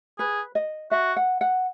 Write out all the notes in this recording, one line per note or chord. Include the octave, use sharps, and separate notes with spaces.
G#4 B4
D#5
F#4 E5
F#5
F#5